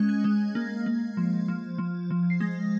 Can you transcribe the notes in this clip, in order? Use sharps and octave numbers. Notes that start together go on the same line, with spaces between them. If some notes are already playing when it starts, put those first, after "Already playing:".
Already playing: G#3 C#4 F#6
G#6
G#3
A#3
A#3
F3
F3
F3
F3
C7
G#3 A#6